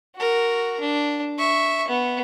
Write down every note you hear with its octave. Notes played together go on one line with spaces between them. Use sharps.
F#4 A#4
D4
E5 C#6
B3